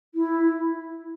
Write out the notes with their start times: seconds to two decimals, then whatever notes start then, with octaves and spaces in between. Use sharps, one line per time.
0.15 E4